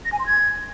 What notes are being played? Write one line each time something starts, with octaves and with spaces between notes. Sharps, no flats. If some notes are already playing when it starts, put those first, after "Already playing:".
A#6
G#5
C6
G#6